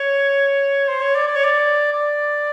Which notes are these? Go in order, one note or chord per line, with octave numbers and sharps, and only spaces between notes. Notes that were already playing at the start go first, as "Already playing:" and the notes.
Already playing: C#5
C5
C#5
D5
D5
C#5
D5
D5